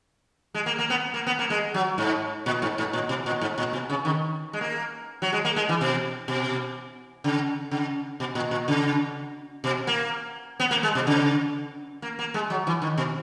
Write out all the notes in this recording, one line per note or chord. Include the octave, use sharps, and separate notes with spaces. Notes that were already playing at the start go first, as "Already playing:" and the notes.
G#3
A#3
A#3
B3
A#3
B3
A#3
G#3
F#3
G#2
A#2
G#2
G#2
A#2
B2
A#2
G#2
A#2
B2
C#3
D#3
G#3
A#3
F#3
G#3
A#3
G#3
E3
B2
B2
C#3
C#3
B2
A#2
A#2
C#3
B2
A#3
B3
A#3
G#3
B2
C#3
A#3
A#3
G#3
F#3
E3
D#3
B2